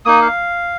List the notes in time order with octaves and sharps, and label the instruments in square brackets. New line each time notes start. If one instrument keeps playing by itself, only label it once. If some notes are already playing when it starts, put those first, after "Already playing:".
[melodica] A#3 D#4 D#6
F5